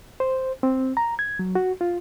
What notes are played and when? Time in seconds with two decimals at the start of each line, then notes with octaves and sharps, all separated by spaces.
0.20 C5
0.63 C4
0.97 A#5
1.19 G#6
1.39 F#3
1.55 F#4
1.81 F4